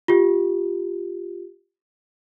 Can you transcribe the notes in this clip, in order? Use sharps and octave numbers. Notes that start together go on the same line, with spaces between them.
F4 G4